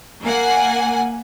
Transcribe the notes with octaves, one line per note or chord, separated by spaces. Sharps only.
A#3 F#5 G#5